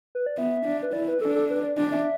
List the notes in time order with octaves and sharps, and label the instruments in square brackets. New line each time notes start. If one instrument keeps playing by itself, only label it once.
[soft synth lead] B4
D5
[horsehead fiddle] B3 [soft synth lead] E5
[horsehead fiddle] D4
[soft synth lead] B4
[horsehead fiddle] E4 [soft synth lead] D5
[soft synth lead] B4
[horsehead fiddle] D4 [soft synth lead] A4
[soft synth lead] A4
B4
D5
[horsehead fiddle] D4 [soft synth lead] D5
[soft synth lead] E5